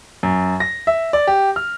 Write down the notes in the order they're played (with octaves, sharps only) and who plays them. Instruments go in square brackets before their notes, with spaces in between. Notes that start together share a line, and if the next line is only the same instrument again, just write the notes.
[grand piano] F#2
A#6
E5
D5
G4
F6